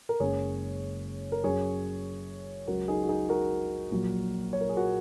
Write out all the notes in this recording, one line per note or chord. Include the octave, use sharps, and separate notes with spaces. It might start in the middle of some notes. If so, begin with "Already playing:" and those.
A#4
F#1 F#2 C#3 G#3 G#4 C#5
A#4
F#2 F#3 G#4 C#5
C#2 C#3 F#3 F#4 A#4
D#4 G#4
F#4
D#4 G#4
F#4 A#4
A#1 A#2 F#3
C#5
A#4
G#4
F#4 A#4